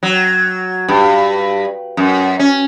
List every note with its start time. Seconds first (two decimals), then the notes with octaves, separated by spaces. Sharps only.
0.03 F#3
0.88 G2
1.97 F#2
2.39 C#4